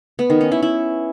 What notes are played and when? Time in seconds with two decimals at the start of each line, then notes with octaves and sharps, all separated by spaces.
0.19 B3
0.30 D#3
0.41 C#4
0.52 E4
0.62 E4